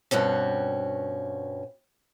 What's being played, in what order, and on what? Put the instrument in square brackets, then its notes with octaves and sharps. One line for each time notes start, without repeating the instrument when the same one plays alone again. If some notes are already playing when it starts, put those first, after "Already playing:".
[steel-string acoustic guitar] G2 B2 C4 C#4